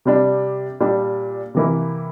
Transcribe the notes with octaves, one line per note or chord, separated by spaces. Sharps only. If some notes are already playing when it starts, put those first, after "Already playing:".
C3 G3 D4
A#2 G3 D4
C3 E3 A#3 E4